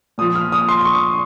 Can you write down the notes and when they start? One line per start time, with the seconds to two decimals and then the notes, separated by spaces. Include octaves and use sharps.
0.18 A#2 F3 D#6
0.35 F6
0.52 D#6
0.69 C6
0.80 D#6
0.85 C#6